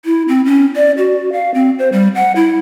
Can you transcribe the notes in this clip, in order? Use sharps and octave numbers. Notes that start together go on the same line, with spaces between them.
E4
C4
C#4
D5
F#4
F5
C4
C5
G3
F#5
E4